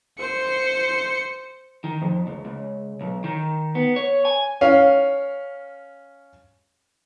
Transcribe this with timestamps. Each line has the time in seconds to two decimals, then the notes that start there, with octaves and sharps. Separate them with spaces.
0.18 C5 C#7
1.84 D#3
2.02 F2
2.27 C#2
2.45 C#2
3.01 B1
3.24 D#3
3.75 B3
3.96 C#5
4.25 G#5
4.61 C#4 F5